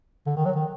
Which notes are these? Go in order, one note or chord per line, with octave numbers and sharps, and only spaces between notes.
D3
D#3
F#3
D#3